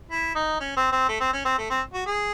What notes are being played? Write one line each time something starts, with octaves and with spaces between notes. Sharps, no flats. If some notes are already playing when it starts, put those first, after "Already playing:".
E4
D#4
C#4
C4
C4
A3
C4
C#4
C4
A3
C4
F#4
G#4